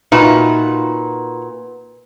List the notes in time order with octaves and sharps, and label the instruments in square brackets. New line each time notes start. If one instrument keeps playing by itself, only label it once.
[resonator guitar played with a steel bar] A#2 F#4 B4 [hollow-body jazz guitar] D#4 F4 E5